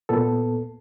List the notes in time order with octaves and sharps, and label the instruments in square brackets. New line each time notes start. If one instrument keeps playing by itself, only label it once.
[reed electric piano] A#2 B3 A4